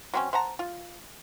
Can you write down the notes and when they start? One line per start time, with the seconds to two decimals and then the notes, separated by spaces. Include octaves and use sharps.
0.14 F#3 C4 C#4
0.33 C5 F#5 A5 A#5
0.59 F4